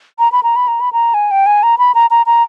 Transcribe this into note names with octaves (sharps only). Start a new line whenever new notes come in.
A#5
B5
A#5
B5
A#5
B5
A#5
G#5
G5
G#5
A#5
B5
A#5
A#5
A#5